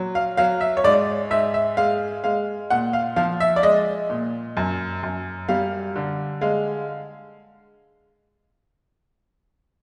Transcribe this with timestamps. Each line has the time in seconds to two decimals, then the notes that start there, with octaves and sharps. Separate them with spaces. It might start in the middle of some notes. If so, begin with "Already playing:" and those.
Already playing: A#2 F#3
0.15 F5
0.37 F#3 F5
0.61 E5
0.77 C#5
0.84 G#2 D5
1.31 G#2 E5
1.54 E5
1.77 G#3 F5
2.24 G#3 F5
2.70 A#2 F#5
2.93 F5
3.16 F3 F5
3.40 E5
3.56 D5
3.63 G#3 D#5
4.10 A#2
4.57 F#2
5.03 F#2
5.48 G3 F5
5.96 D3
6.41 G#3 F5